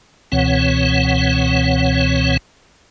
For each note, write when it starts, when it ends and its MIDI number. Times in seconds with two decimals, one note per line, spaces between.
0.32 2.37 37
0.32 2.37 47
0.32 2.37 52
0.32 2.37 60
0.32 2.37 73
0.32 2.37 78